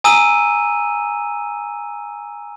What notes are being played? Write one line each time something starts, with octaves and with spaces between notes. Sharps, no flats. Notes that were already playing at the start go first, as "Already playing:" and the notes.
G#5 A#5 D#6 E6 D#7